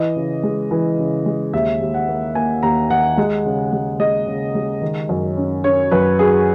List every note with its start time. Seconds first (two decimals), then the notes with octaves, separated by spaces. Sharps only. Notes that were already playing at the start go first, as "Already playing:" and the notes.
Already playing: E3 D#5
0.16 C#3
0.43 G#3
0.71 E3
0.99 C#3
1.26 G#3
1.53 D#2 E5
1.81 D#2
1.94 F#5
2.08 A#3
2.35 A#3 G#5
2.63 D#2 A#5
2.90 D#3 F#5
3.18 G#3
3.46 C#3
3.72 G#3
3.99 G#3 D#5
4.27 C#3
4.55 G#3
4.81 D#3
5.09 F#2
5.37 C#4
5.64 C#4 C#5
5.91 F#2 B4
6.19 F#3 G#4